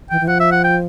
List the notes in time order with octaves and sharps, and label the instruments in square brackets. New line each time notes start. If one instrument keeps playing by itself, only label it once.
[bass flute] E3 [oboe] G5
[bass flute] E3
[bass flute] F3 [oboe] F#5
[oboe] E5
F#5
G5